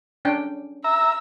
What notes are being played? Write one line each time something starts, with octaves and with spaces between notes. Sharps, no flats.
C#4 D4 G5
E5 A#5 E6